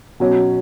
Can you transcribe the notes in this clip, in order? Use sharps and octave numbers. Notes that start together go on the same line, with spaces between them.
B2 F#3 C#4